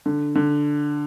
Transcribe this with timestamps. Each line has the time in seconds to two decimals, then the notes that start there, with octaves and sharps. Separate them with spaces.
0.06 D3
0.35 D3